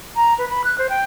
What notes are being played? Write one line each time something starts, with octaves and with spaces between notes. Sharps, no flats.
A#5
B4
B5
F#6
C5
G5